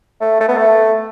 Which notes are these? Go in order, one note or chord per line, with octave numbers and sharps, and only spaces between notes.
A3
A3
B3
A3